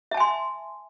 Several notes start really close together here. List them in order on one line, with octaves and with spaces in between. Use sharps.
E5 A5 G#5 C6